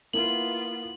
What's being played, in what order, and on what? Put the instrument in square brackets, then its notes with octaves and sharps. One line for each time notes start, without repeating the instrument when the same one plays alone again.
[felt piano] A#3 [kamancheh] B3 F4 [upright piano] E4 [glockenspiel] F#7